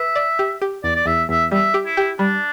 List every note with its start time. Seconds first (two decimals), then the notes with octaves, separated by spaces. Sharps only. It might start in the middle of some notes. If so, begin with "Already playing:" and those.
Already playing: B4 E5
0.15 D5
0.39 G4
0.62 G4
0.84 E2 D5
0.96 D5
1.06 E2 E5
1.29 E2 E5
1.51 G3 E5
1.74 G4
1.86 E4
1.97 G4
2.19 G3 D4